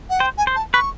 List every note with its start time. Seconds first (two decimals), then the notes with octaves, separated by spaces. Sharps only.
0.10 F#5
0.20 C5 G5
0.38 G#5
0.47 C5
0.56 A5
0.74 B4 C#6